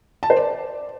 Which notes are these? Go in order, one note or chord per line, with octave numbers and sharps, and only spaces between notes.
A5
C5
D5